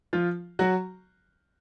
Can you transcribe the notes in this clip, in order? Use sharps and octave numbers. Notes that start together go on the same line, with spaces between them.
F3 F4
F#3 F#4